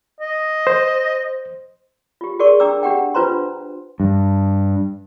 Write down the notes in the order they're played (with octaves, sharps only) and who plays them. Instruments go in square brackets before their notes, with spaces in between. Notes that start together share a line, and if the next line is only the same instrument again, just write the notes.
[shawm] D#5
[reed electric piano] C5
[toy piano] F4 G4
F#4 G#4 A#4 D5 C#6
D4 G5 A#5 D6 E6
D4 G4 F#5 G5
D4 F4 B4 C5 A#5 C6
[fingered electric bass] G2